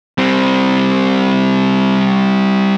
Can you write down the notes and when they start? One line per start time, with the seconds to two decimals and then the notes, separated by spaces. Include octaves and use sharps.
0.18 G3 C4